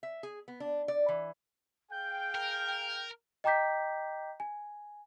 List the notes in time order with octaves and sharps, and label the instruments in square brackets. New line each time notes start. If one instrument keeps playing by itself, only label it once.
[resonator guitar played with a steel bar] E5
G#4
B3
D4
D5
E3
[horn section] G#4 F5 G5 [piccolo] G6
[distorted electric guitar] A#4
[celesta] D#5 G5 A#5 D6 G6 B6
G#5